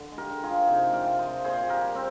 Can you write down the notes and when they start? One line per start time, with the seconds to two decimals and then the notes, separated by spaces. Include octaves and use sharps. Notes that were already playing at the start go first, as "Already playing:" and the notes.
Already playing: D3
0.12 G#3
0.18 G4 A#4
0.30 D3
0.43 F4 G#4
0.50 F3
0.62 G#4
0.68 C3 D#4 G4
0.87 G#3
0.93 D5 F5
1.06 C3
1.19 C5 D#5
1.26 F3
1.44 A#2 G#4 C5
1.63 A#2
1.69 G4 A#4
1.82 G3
1.95 C4